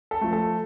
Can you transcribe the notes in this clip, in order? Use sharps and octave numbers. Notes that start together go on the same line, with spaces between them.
A4
F3 A3
A4